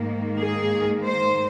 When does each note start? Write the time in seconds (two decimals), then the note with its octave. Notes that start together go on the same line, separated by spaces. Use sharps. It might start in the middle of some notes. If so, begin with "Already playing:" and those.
Already playing: G#2 D#3 A#3
0.41 G#4
1.04 C5